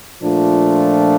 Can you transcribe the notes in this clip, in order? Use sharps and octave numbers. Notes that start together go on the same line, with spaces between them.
A#2 F3 A3 D4 F4